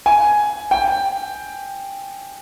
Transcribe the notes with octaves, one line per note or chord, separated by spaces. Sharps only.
G#5
G5